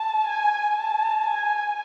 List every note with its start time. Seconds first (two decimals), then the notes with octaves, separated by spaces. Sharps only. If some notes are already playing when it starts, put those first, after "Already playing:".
Already playing: A5
0.27 G#5
0.77 A5
1.27 G#5